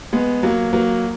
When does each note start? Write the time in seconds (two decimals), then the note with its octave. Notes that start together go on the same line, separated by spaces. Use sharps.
0.13 G#3 B3
0.43 F#3 A#3
0.73 F#3 A#3